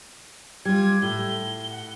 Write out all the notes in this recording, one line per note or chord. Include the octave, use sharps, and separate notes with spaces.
G3 F4 G#6
A2 G7
F#5